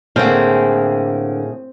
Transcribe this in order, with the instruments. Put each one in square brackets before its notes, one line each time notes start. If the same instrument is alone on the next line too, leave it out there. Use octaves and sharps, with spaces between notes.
[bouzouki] A2 G#4 F5 [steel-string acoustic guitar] D3 A#3 [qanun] C4